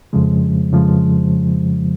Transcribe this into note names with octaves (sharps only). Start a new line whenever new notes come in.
F2 C#3 F3 G#3
F2 C#3 F3 G#3